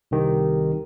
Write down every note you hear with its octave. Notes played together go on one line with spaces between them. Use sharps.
C2 D#3 G4